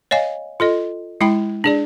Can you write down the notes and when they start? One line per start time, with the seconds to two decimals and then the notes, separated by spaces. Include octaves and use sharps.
0.11 C#5 D#5 F5 G#5
0.60 F4 A4 D#5
1.21 G#3 E4 G5 B5
1.64 D4 G#4 D5